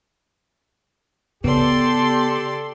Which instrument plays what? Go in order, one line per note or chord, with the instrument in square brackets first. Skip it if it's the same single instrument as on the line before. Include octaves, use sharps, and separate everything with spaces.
[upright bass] C#3 [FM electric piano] B3 [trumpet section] G4 A4 [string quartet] D5 C6